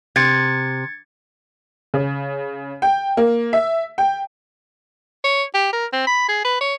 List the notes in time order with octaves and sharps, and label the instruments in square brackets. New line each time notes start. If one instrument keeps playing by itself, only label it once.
[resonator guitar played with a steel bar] C3 [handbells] G#6 A6 C#7
[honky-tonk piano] C#3
G5
A#3
E5
G5
[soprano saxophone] C#5
G4
A#4
C4
B5
G#4
B4
C#5